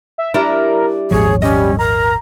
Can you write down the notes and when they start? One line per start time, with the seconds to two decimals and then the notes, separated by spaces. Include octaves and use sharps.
0.18 E5
0.34 G3 D4 E4 A#4
1.11 D#1 G#1 F3 G#4 C#5
1.42 G3 C#4 D#5
1.79 A#4 A#5